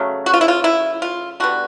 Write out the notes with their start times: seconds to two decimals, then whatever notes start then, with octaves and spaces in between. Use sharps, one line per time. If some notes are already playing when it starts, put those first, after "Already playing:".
Already playing: C#3 F#3 A3
0.26 F#4
0.34 F4
0.41 E4
0.48 F4
0.64 E4
1.02 F4
1.40 D3 G3 B3 F#4